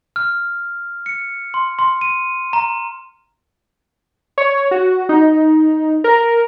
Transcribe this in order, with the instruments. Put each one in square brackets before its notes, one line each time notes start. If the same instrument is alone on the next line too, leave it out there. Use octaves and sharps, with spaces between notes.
[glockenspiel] F6
C#7
C6
C6
D#7
A#5
[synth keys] C#5
F#4
D#4
A#4